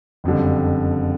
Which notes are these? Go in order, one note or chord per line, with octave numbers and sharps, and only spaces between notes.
F#1 F2 D3 G3